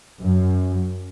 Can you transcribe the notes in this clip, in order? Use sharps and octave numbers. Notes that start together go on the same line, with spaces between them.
F#2